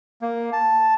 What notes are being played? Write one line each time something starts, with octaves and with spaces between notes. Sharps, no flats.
A#3
A5